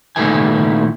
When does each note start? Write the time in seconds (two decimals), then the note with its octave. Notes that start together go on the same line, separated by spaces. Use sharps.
0.16 A#2 D#3 A3 B3 E4 G#5